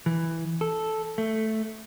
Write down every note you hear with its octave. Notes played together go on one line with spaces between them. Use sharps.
E3
A4
A3